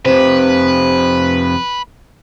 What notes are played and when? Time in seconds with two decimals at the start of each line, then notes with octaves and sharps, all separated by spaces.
0.05 F2 C3 B4 C5